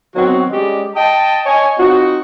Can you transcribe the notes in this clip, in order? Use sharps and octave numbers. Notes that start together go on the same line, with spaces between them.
D#3 F#3 B3 C4 F#4
G3 G#3 C#4 G4 D5 D#5
D#5 G5 A5
C#5 D#5 G#5
C4 D#4 F4 F#4